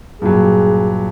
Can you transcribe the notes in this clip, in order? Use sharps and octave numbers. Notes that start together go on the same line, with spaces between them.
G2 A#2 F#3 G#4